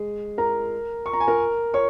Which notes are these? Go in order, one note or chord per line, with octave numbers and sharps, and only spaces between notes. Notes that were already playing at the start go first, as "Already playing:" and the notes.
Already playing: G#3 G#4
A#4 A#5
C#6
A#5
G#5
A#4 A#5
C#5 C#6